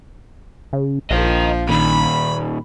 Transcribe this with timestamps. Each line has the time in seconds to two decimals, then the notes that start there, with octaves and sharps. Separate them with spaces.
0.73 C#3
1.10 A#1 F3 A#4 D#5
1.69 A#2 D#3 B5